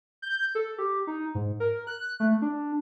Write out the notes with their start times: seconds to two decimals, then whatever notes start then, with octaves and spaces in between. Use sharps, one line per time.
0.22 G6
0.55 A4
0.78 G4
1.07 D#4
1.35 G#2
1.60 A#4
1.87 F#6
2.20 A3
2.42 D4